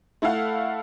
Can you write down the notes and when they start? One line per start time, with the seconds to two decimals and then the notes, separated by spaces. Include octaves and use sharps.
0.22 A3 E4 A4 F5 F#5